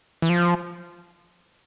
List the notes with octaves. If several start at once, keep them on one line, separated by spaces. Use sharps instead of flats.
E3
F3